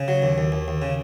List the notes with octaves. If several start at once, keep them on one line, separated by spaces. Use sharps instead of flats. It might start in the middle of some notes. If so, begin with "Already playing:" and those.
Already playing: C#3
F#3
D#2
D#2
D#2
D#2
C#3